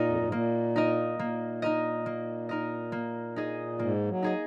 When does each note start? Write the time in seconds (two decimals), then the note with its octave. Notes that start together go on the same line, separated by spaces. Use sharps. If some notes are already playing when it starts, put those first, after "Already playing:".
Already playing: A#2 A#3 D#4 A#4 D#5
0.08 F2
0.17 F#2
0.25 G#2
0.32 A#2 A#3
0.76 D#4 A#4 D#5
1.19 A#2 A#3
1.62 D#4 A#4 D#5
2.06 A#3
2.49 D#4 A#4 D#5
2.92 A#3
3.36 D#4 G#4 D#5
3.79 G#2 A#3
4.08 F#3
4.23 D#4 G#4 D#5